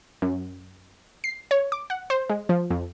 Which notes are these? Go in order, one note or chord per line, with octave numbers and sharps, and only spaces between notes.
F#2
C7
C#5
D6
F#5
C5
G#3
F3
F2